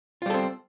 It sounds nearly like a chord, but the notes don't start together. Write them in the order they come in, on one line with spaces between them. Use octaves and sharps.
F4 G3 A4 C4